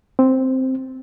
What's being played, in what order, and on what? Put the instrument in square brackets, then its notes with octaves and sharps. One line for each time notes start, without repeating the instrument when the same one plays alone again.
[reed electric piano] C4